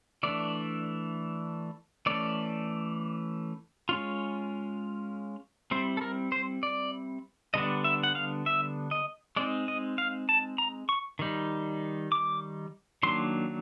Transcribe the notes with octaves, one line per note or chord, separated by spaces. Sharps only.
E3 A3 D4 D5
E3 A3 C#4 D5
G#3 C#4 F4
G3 C4 E4 C5
A4
A#4
C5
D5
D3 G3 B3 D4 D#5
E5
F#5
F5
E5
D#5
G#3 C4 D#4 D5
D#5
F5
A5
A#5
C#6
D#3 G3 D#4
D6
D#3 F#3 A#3 D4 C6